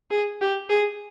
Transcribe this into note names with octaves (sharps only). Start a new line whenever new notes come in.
G#4
G4
G#4